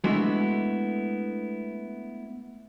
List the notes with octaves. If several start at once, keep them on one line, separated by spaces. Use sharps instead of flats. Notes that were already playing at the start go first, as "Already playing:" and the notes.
G#3 A3 B3 D4 E4 F#4